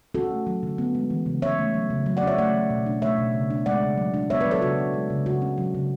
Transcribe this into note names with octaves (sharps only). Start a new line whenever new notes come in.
C#4 F#4 A4
A3
F#3
D3
B3
G#3
E3
C#3
C#4 C#5 E5
A3
F#3
C#3
F#3
D5 F#5
C#4 C#5 E5
A3 D5 F#5
F#3
B2
D4
A3 C#5 E5
B2
C#3
D4
G#3 D5 F#5
C#3
F#3
D4
B3 C#5 E5
F#3 B4 D5
A4 C#5
C#3 F#4 A4
D4
G#3
C#3
C#3 F#4
C#4
F#3
C#3